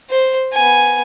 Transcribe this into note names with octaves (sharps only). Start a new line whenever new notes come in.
C5
B3 G#5